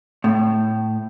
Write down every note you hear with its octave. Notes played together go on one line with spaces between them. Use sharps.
A2